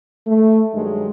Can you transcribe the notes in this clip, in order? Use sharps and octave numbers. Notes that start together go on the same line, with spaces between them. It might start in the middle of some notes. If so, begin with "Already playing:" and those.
A3
G2 D#3 F#3 G#3